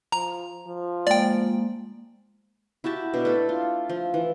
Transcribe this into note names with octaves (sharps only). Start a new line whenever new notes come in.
F3 A#5
F3
G#3 A#3 D5 G5
E4 F#4 G4 A5
B2 D4
A3 A4
F4
F3
E3